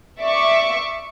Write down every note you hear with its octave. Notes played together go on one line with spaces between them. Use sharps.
D5 E5 C#6 D6